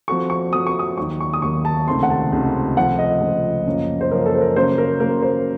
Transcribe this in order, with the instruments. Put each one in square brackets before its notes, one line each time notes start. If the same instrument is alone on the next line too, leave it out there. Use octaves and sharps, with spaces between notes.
[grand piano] F3 C4 F#4 A4 [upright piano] C#6
[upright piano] C#6
[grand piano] F3 C4 F#4 A4 [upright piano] D#6
[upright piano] C#6
D#6
[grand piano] D#2 D#3 F#3 A#3 [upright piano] C#6
[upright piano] C#6
D#6
[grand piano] D#2 D#3 F#3 A#3 [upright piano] C#6
[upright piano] A5
[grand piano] C#2 C3 D#3 A3 C4 [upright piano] C6
[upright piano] F#5
A5
[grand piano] C#2 C3 D#3 A3 C4
[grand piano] C#2 C3 F3 A3 [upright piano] F#5
[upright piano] D#5
[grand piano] C#2 C3 F3 A3
F#2 C#3 F3 A#3 C#4
[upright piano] C5
[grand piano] F#2 C#3 F3 A#3 C#4 [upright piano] A#4
[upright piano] A4
C5
A#4
[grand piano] C#3 F#3 A#3 [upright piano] C5
[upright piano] A#4
[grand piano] C#3 F#3 A#3 [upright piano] A#4
[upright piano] C5